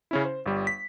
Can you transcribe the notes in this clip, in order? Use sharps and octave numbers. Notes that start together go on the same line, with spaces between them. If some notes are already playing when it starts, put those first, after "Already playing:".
C#3 C#4 E4
C5
G1 G3
B6